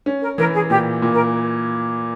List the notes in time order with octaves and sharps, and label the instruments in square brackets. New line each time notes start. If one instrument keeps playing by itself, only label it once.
[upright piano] C#4
[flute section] A#4
[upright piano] E3 [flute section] A#4
[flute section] G#4
[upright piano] A#2 [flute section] G4
[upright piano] A#2
[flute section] A#4